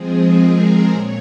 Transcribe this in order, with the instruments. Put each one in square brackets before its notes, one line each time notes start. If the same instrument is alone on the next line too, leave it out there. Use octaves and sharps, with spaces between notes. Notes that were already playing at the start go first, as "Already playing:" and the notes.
Already playing: [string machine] F3 G#3 C4 G#4
A#4
A#2 C#5